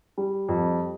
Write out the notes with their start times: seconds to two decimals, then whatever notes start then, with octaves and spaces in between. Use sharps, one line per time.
0.18 G3
0.49 F2